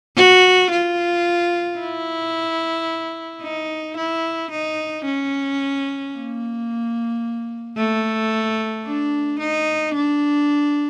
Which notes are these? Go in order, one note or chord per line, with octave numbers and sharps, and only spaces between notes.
F#4
F4
E4
D#4
E4
D#4
C#4
A#3
A3
D4
D#4
D4